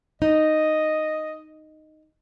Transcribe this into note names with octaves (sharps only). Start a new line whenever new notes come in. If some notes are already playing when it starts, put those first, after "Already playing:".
D#4 D#5